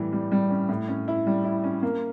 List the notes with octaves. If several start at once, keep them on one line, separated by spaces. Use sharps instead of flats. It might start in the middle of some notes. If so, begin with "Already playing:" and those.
Already playing: A2 E3 G3
G3
G3
C#4
A2
C#4
E4
G3
E4
C#4
A#3